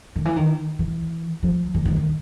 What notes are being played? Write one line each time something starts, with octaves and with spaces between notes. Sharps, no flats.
D#3
E3
D#3
E3
F3
E3
D#3
D#3